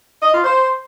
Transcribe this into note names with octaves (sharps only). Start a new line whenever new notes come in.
D#5
F4
C5